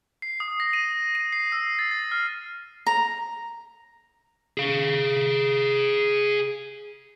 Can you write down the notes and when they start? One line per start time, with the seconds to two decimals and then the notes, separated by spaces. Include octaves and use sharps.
0.22 C7
0.40 D#6
0.60 A#6
0.73 D#7
1.15 D#7
1.32 C7
1.52 E6
1.79 A6
1.91 A6
2.12 F6
2.86 A#5
4.58 G#4 F5